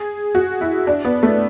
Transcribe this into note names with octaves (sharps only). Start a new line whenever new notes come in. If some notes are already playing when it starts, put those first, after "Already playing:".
Already playing: G#4
F#4
E4
D4
B3
A3